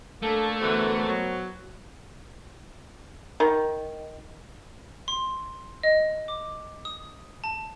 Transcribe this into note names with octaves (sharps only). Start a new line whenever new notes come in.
A3 A#3 D4 A4
E2 D3 E3 F#4 A#4 C5
B2 F#3
D#3
C6
D#5
D6
D#6
A5